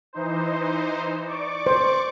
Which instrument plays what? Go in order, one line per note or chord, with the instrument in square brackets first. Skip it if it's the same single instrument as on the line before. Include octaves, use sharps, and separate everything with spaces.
[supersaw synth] E3 D#4 C5
D5 C#6 D6
[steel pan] C5